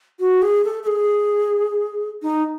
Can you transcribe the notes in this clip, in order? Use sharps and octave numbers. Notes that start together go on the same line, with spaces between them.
F#4
G#4
A4
A4
G#4
D#4